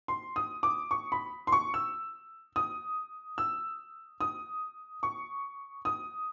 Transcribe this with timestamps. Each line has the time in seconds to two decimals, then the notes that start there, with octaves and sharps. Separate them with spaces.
0.08 C6
0.36 D#6
0.63 D6
0.91 C#6
1.12 B5
1.47 C6
1.52 C#6
1.74 E6
2.56 D#6
3.38 E6
4.20 D#6
5.03 C#6
5.85 D#6